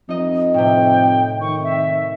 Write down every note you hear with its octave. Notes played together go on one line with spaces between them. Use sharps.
F2 D#4 D#5
A2 C3 G5
D#3 C#6
E5